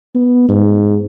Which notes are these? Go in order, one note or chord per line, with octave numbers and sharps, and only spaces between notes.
B3
G#2